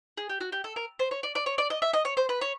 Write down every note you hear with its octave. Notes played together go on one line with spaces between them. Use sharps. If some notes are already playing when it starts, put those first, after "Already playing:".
G#4
G4
F#4
G4
A4
A#4
C5
C#5
D5
D5
C#5
D5
D#5
E5
D#5
C#5
C5
B4
C#5